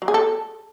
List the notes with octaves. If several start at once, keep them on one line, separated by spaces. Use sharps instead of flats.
F#3
G#4
A4